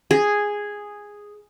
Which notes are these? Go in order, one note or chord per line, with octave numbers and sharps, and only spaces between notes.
G#4